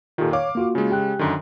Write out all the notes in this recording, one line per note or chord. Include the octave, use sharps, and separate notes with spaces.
A#2 D#3 F4 G4 A4
C#5 F5 D6
A#3 F4 F#4
C#3 G#3
G4 G5 F#6
F#2 D3 D#3